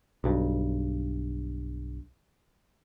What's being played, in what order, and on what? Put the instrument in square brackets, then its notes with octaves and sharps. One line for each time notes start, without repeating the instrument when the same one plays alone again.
[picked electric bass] B1 G2